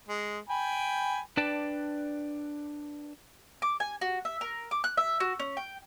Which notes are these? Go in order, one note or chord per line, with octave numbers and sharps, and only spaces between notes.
G#3
G5 G#5 B5
D4 B4 D5 G5 A5
D6
G#5
F#4
E5
A#4
D6
F#6
E5
F#4
C#4
G5